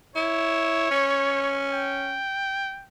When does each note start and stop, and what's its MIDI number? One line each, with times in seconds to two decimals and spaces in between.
0.16 0.91 64
0.16 1.59 73
0.91 2.21 61
1.72 2.86 79